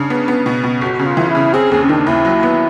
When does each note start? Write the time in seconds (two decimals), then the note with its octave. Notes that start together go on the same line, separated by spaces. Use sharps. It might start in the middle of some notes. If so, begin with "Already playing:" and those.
Already playing: C#3 D4
0.10 B3
0.28 B3
0.46 B2
0.64 B2
0.82 G1 F#4
0.99 C#3
1.06 F4
1.17 E3
1.29 E4
1.35 C#3
1.53 C4 G#4
1.72 D#2 G#4
1.83 C#4
1.89 D#3 D4
2.07 D#2 E4
2.25 F#3
2.43 B3